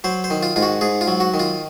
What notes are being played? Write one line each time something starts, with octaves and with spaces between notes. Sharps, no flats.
F#3 C5
C5
D#3
F4
G#2 F4
F#4
G#2 G#4
F4
F#3
F#4
D#3
F4